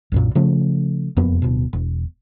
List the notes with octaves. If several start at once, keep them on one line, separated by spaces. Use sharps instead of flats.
B1 F#2 A#2
C#3 F3 A3
E1 F2 A#3 B3
D1 B2
E1